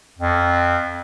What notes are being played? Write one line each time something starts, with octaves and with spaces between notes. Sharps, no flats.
F2